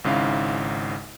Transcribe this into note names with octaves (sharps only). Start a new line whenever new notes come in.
G#1 G#2 C#3 E4 F5